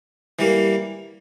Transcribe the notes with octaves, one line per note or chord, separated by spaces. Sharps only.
E3 G3 A#3